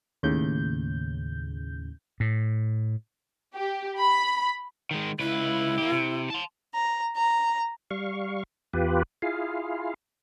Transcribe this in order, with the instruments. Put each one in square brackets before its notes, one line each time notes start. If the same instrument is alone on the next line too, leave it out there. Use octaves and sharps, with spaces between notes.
[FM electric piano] D#2 A2 C#3 G6
[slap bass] A2
[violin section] G4
B5
[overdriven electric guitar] D#3 G#3
[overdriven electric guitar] C#2 B4 [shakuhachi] E4
[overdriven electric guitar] A#3 G4
C3
A5 C6
[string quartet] A#5
A#5
[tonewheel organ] G3 F5 C#6
E2 F4 G4 B4
E4 F4 G#4 F5